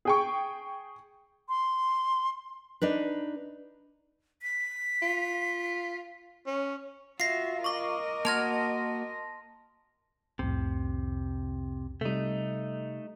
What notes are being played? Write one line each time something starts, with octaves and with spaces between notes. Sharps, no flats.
G#4 G5 C#6
C6
D4 D#4 B4
B6
F4
C#4
F4 F#4 E5 A#6 C7
A#4 D#5 C#6 D6
A#3 F#4 A5 C6 F6 G#6 A#6 F7
C2 F2 A2 C3
C3 G3 A3 D#4